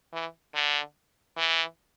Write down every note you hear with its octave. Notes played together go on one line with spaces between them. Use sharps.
E3
D3
E3